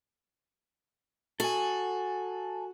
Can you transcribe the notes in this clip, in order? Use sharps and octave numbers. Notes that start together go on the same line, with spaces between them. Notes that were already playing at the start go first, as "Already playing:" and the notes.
F#4 A4 G#5